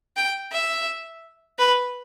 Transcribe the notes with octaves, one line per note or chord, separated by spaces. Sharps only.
G5
E5
B4